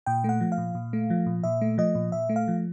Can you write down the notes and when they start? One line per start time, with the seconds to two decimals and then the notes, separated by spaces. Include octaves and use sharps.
0.06 A#2 G5
0.24 A3 F#5
0.41 F3
0.52 F5
0.58 A#2
0.75 A#2
0.93 A3
1.10 F3
1.26 A#2
1.43 A#2 E5
1.61 A3
1.78 F3 D#5
1.95 A#2
2.12 A#2 E5
2.29 A3
2.36 F5
2.48 F3